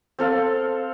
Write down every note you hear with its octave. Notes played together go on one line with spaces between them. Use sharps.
C4 A4 F5